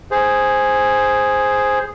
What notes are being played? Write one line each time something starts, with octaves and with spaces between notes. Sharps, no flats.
G#4 C5